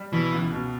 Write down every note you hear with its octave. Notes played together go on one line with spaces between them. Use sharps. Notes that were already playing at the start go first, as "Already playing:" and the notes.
Already playing: G3
B2 E3
C#2
B2